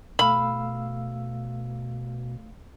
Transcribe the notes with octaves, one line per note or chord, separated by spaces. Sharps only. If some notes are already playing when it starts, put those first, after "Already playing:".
B2 A3 F5 B5 E6